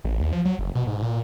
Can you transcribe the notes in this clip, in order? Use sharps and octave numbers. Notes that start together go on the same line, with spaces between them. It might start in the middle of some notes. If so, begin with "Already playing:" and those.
A1
D#2
F3
F#3
F#1
B2
G#2
A#2